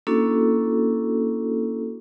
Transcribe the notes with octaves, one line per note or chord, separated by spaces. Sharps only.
A#3 C#4 D4 E4 F#4 A4